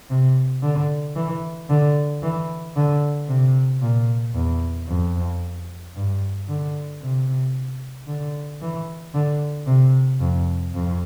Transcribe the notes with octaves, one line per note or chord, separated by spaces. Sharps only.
C3
D3
E3
D3
E3
D3
C3
A#2
E2
F2
G2
D3
C3
D3
E3
D3
C3
F2
F2